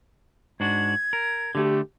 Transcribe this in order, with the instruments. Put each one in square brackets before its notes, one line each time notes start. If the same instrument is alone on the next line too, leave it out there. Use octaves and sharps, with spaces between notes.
[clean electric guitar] G#2 D4 F#4 [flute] G#6
[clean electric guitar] A#4
[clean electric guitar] D3 A3 [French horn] G4